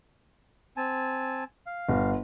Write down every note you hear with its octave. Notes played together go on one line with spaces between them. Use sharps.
C4 G#5 A5
F5
G1